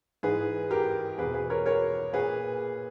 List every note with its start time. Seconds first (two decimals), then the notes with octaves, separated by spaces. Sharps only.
0.23 G#2 E3 G#4 B4
0.71 G4 A#4
1.18 E2 B2 G#4 B4
1.34 G#4 B4
1.50 A#4 C#5
1.66 A#4 C#5
2.13 A#2 G#4 B4